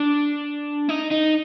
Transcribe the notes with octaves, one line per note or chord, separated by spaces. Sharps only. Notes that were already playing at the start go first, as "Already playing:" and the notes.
Already playing: D4
D#4
D#4